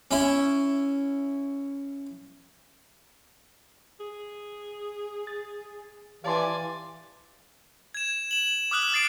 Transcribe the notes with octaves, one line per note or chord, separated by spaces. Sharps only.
C#4 E4
G#4
A6
E3 G4 D5 F5 G#5 A5 C6
G#6 E7
E7 F#7
D6 D#6 F6 F#6 F#7
D#6 A6 C7 D7